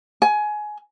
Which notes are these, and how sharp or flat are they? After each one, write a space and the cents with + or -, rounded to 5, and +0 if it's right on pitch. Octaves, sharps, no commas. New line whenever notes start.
G#5 +20